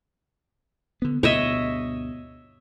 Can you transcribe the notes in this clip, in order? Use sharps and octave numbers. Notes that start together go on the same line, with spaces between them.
D3 B3
D2 G2 B2 C#5 D#5 E5